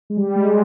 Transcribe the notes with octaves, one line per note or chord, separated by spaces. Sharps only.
G#3
G3
G#3